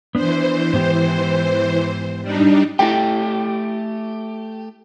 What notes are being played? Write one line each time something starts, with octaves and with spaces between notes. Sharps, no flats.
E3 B3 D4 C5
G#2 B3 G4
G3 D4 D#4
A3 E4 G4 G5